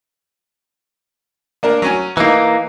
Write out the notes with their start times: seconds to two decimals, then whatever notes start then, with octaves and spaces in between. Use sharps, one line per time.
1.63 A#3 D4 A#4
1.82 F#3 C#4 G#5
2.17 E3 A#3 D#4